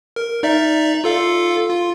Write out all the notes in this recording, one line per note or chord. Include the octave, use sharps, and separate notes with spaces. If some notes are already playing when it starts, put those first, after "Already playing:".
A#4
D#4 D5 E5
F4 A4 F5
F4